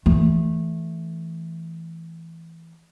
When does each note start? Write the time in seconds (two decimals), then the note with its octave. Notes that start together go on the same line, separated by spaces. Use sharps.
0.06 E3 A3